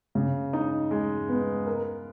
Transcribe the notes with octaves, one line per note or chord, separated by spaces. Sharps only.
C#3
D#4
G#3
B3
A#4